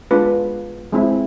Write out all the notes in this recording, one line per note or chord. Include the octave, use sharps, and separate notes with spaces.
G#3 B3 D4 F4 B4
G#3 C4 E4